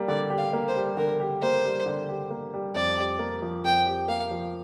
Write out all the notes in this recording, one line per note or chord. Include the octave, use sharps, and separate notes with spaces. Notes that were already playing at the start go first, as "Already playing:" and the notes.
Already playing: G3 A#3
D3 D5
G4
F5
A#3
C5
G3
D3 A#4
G4
A#3 C5
G3
D3
G4
A#3
G3
F2 D5
G4
A#3
F3
F2 G5
G4
A#3 F5
F3